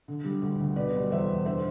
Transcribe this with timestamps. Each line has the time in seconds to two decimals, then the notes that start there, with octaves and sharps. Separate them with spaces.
0.08 D3
0.25 G3
0.42 D2
0.60 D2
0.76 B2 B4 D5
0.93 G3
1.11 E2 C5 E5
1.29 E2
1.45 D3 C5 E5